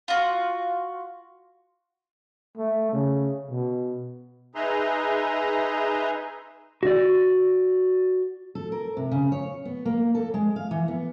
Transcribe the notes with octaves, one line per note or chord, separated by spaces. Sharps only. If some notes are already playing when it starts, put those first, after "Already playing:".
F4 F#4
A3
C#3
B2
D#4 G#4 B4 E5 A#5 C6
F#4 D5
A4
A#4
C3
C#3
C#5
B3
A#3
A4
G#3
F5
E3
B3